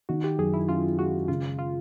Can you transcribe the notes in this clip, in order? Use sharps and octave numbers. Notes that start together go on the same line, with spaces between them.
D#3 F#4
G4
F#2 G#4
E4
C#4 F4
G#3 F#4
C#3 F4
F4